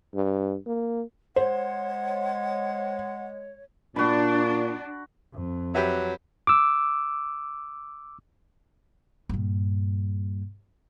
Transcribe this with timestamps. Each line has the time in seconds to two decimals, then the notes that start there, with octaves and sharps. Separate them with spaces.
0.14 G2
0.67 A#3
1.36 G#3 C5 C#5 F#5
3.96 A#2 D4 F#4 B5
5.34 F2
5.75 F#3 G4 B4 E5
6.47 D6 E6
9.29 G2 A#2